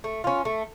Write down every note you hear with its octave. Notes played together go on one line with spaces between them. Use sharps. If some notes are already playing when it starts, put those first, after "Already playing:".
A3
C#4 F4
A3